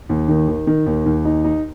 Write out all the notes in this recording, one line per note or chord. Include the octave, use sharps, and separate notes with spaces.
D#2
D#3
D#3
D#3
D#2
D#2
D#4
D#4